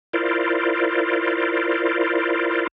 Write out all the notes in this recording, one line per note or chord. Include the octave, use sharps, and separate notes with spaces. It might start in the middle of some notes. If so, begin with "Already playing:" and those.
E4 F4 A#4 C5 D5